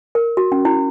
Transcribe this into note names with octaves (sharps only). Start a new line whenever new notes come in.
A#4
F#4
C#4
E4